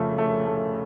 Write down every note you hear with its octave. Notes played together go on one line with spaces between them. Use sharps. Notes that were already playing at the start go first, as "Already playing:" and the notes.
Already playing: F2 C#3 F3 A3
A3
A3